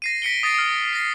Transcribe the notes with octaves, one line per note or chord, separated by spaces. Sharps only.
A#6 C7 D#7
B6 C#7 D7 G7
D#6 A6 A#6 C7 D7
D#6 F6
A#6 C7